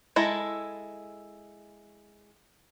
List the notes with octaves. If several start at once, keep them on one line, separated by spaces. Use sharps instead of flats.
G#3 E4 A4 A#5